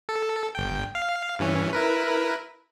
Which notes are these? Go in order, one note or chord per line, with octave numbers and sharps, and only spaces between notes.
A4
G1 G5
F5
G2 E3 C#4
E4 A#4 B4